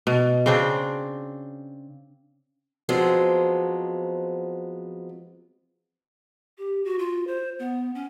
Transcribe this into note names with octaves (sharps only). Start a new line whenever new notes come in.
B2
C#3 C4 D4
F3 F#3 G#3 B3 C4
G4
F#4
F4
C5
B3
C#4